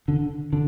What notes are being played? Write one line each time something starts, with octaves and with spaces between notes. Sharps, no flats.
D3
D3